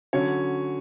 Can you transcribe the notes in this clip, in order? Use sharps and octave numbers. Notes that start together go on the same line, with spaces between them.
D3 F#3 C#4 C#5